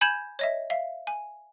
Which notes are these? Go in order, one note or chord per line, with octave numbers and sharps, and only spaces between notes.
G#5 B5 G6 G#6 E7 F#7
C#5 D#5 E5
E5 F5
G#5